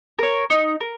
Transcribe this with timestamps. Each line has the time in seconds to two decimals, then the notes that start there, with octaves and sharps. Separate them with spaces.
0.19 A#4 C#5
0.50 D#4
0.81 A#4